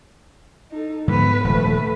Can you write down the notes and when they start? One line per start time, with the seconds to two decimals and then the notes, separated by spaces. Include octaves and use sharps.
0.72 D#4 A4
1.08 G#2 D3 F3 B3 B4
1.44 D#1 F3 A3 B4